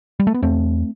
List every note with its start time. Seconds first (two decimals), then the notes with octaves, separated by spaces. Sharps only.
0.20 G3
0.27 A3
0.34 B3
0.42 E2 A3 C4